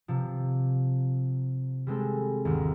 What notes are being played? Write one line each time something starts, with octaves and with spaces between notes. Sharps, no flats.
C3 F3
G3 G#3 C4 A4
G1 D#2 D#3